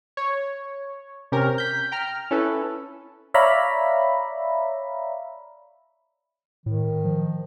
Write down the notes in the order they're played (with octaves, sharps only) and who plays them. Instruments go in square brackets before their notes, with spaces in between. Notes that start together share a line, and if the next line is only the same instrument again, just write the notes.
[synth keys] C#5
C3 C#4 G4 A#4
G6 B6
G5 A#5 F6
C#4 E4 A4 B4
[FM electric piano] C#5 D5 E5 F5 A#5 B5
[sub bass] A2 [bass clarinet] D#3
[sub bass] F3